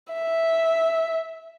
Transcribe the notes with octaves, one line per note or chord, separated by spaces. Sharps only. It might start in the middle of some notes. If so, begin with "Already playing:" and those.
E5